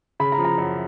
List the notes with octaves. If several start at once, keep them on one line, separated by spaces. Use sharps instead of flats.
C#3 B5
A#5
F3
A#5
F#2